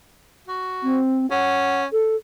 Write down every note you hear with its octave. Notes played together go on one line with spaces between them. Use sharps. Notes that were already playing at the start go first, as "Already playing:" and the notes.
F#4
C4
C#4 F#5
A4